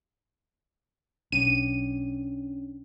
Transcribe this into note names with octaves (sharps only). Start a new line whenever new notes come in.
B1 C#4 D4 D#7